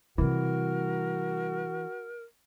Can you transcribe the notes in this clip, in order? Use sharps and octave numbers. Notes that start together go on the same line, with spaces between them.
C3 E3 G3 F#4 A#4